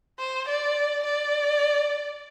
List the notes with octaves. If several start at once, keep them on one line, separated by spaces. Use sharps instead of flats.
C5
D5
D5